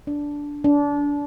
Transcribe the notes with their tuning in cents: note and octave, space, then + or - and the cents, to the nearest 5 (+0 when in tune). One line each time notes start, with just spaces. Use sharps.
D4 -10
D4 -25